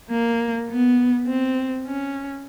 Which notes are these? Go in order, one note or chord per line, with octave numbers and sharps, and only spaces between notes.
A#3
B3
C4
C#4